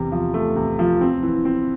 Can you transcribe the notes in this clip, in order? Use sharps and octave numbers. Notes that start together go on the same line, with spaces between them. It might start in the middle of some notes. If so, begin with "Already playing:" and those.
Already playing: E2 C3
F3
A3
C3
F3
C4
E3
C4